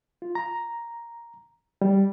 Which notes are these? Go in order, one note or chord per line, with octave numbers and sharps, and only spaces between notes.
F4
A#5
G3